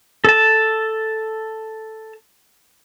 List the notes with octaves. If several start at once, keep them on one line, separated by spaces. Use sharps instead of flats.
A4 A5